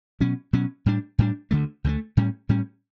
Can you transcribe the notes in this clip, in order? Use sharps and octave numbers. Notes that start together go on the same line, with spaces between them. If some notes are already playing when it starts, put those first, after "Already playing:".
B2 F#3 C#4
B2 F#3 C#4
A2 G3 D4
A2 G3 D4
D2 D3 F#3 A3
D2 D3 F#3 A3
A2 G3 C#4
A2 G3 C#4